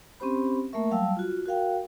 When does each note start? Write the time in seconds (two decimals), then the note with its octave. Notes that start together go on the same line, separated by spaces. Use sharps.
0.20 C4 C#4 G4 C5 B5
0.73 A3 A#3 A#4 E5 C#6
0.91 F#3 G3 F5 G5 A5 E6
1.17 F4 F#4
1.46 F#4 A#4 F5 G5